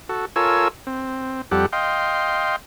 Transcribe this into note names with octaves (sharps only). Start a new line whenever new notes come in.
F#4 A4
F4 A4 A#4 C#5 G#5 E6
C4
F2 G3 G4 A4 F#5
D#5 F5 G5 C6